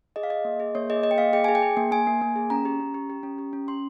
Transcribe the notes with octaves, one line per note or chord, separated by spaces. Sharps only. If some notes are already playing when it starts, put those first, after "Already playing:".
G#4 D#5
F5
G#4 D#5
A#3
G#4
A#3 C#5
G#4 D#5
A#3 D#5
G5
A#3 F5
G#4 G5
G#4 G#5
G5
G#4
A#3
A#3 G#5
A#3
A#3
G#4
C#4 A#5
G4
C#4
G4
G4
C#4
G4
C#4
C#4 C6